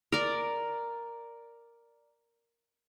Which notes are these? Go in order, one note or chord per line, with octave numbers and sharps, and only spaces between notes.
A#4 D5